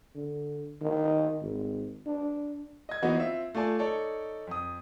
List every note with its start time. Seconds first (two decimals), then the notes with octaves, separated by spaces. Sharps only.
0.15 D3
0.82 D#3
1.42 G#1
2.07 D4
2.89 D#5 G#6
3.02 E3 F3 A#3 B3 D#4 F#4
3.15 C4 F4 E5
3.55 A3 F4 D5 G#5 A5
3.79 D#4 A4 C#5 D5
4.47 F2 D#6